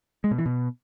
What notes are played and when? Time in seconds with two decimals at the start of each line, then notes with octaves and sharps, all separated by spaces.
0.24 G#3
0.31 B2
0.38 E3
0.46 B2